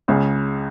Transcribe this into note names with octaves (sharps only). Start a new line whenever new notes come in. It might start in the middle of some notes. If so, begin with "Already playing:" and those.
C#2 C#3